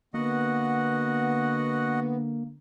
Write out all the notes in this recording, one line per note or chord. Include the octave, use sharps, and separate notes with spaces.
D3 A#3 B3 F#4 D#5 F#5